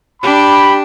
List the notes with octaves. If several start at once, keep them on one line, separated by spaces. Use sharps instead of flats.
D4 G4 B5